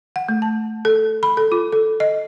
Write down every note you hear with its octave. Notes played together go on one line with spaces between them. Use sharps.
F#5
A3
A5
A4
B5
A4
F4
A4
D#5